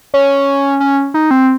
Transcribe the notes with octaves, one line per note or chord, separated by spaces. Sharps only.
C#4
C#4
D#4
C4